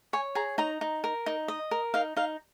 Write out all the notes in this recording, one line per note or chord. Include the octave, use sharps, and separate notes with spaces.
C#5 G#5
G#4 A#5
D#4 A#5
D#4
A#4
D#4
D#5
A#4
D#4 F5
D#4 F5